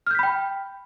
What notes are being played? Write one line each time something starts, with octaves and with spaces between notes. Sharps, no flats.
G5 B5 F6 G6 B6